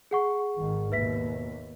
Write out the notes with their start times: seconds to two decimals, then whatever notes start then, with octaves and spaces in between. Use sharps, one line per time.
0.11 G#4 F#5 C#6
0.56 G#1 G#2 D#3
0.92 D#2 B2 B4 E5 B6